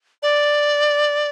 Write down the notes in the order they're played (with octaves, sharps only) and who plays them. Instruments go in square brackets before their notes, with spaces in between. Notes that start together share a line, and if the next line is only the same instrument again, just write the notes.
[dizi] D5